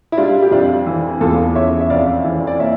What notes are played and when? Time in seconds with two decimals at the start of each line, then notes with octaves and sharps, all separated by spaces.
0.12 E4
0.17 G3 D4 F4
0.43 G4
0.51 F2 D4 F4
0.86 E3
1.21 E2 F4 A4
1.55 C#3 C#5 E5
1.81 E5
1.90 F2 D5 F5
2.24 E3
2.47 D5
2.59 A#3 C#5 E5